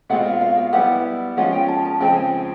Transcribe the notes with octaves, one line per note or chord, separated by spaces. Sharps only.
B2 G#3 C4 F4 F#5
F5
F5
F5
G3 B3 E4 G4 F#5
F3 G#3 C#4 F4 F#5
G5
A5
A5
C#3 F3 G#3 C4 G5
G#5
G5